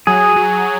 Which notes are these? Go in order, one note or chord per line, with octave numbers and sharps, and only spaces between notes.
F#3 G#4
F#3